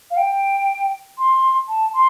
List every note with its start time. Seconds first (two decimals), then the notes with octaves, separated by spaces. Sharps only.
0.11 F5
0.17 G5
1.18 C6
1.69 A5
1.94 C6